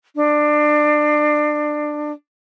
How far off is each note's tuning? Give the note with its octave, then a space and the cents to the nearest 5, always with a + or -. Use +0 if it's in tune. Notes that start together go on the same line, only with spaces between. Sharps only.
D4 +25